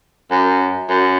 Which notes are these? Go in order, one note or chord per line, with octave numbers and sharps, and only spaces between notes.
F#2
F#2